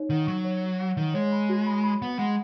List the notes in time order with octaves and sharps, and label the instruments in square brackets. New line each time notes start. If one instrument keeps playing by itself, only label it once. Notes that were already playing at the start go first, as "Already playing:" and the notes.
Already playing: [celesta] D#4 C#5
[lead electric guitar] D#3 [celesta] F#5
[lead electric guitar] F#3 [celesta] C#6
[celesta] C#5
C#5
F#5
[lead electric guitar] D#3 [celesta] F#5
[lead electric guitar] G#3 [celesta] C#5
[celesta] B5
F#4
B5
B5
[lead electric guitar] B3 [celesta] F#5
[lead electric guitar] G#3 [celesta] F#5